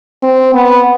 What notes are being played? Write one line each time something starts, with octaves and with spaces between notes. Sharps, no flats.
C4
B3